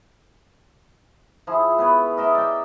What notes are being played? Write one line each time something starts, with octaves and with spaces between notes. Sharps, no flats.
F3 E4 G#4
B3 B4 C#5
A#4 D#5 E5 B5
D5 G5